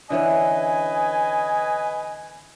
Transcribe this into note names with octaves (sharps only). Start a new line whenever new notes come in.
D3 E3 C#4 B4 D#5 G#5